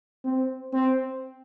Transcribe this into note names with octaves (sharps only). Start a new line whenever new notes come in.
C4
C4